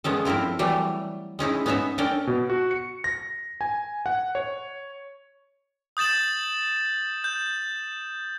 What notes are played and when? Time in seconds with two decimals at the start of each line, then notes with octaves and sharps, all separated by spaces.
0.04 G#3 B3 C#4 A4
0.25 F3 C4 E4 A4 A#4
0.59 E3 F#3 G3 A3
1.39 G#3 C#4 D#4 E4
1.66 B3 C#4 D#4 C#5 E5
1.98 C#4 D4 A4 A#4 D5 G5
2.27 B2
2.50 F#4
2.71 C#7
3.04 A#6
3.61 G#5
4.06 F#5
4.35 C#5
5.97 D#6 G6 A6 E7 F#7
7.24 G6